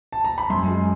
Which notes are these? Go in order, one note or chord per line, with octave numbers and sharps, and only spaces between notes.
A5
A#5
B5
F#2 C6
G#3